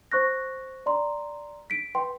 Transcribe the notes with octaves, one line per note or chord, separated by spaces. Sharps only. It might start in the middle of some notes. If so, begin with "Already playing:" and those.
C5 C#6 F#6 A#6
D5 A#5 C6
B6 D7
B4 G5 C6